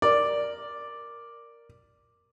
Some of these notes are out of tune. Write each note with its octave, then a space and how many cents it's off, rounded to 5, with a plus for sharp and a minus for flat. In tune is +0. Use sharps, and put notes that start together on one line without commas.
A#4 +0 D5 +0